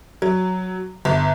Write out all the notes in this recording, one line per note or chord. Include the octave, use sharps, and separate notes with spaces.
F#3
G1